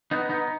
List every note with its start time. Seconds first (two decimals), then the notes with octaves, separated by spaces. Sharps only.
0.11 B3 D#4
0.29 B3 D#4